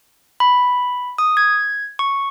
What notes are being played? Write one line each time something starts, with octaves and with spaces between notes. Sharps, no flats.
B5
D#6
G#6
C#6